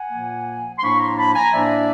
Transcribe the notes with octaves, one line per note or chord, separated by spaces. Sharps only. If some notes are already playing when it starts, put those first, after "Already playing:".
Already playing: F#5 G#5
A#2 F3 A#3
C6
A2 F3 A#3 D4 B5 C#6
A#5 C6
A5 B5
G#5 A#5
A2 F3 A#3 D4 D5 E5